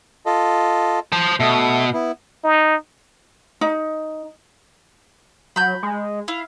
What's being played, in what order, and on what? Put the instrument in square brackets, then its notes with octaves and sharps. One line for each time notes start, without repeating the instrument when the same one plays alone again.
[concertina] F4 A4 D#5
[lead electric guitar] C5 A5
[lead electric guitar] B2 [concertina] A3 E5
[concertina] B3 E4
[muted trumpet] D#4
[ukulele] D#4
[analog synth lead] F#3 [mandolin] B5 G6
[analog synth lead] G#3
[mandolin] E4 [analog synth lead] F5